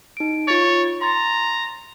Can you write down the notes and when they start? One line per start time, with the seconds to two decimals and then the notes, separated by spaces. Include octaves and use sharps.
0.17 D#4 D7
0.48 F4 C#5 A6
1.01 A#5 C6 A6